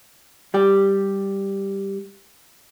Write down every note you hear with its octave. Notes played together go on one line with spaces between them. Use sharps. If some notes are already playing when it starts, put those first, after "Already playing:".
G3 G4